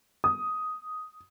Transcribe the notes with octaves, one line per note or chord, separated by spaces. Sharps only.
D#6